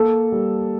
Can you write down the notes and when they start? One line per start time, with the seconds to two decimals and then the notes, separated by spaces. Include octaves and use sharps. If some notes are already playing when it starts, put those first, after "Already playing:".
Already playing: A#3 A4
0.32 G3